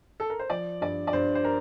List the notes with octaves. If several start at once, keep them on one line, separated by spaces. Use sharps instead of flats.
A4
A#4
C5
F3 D5
G2 D5
D5
G2 C5
C5
A#4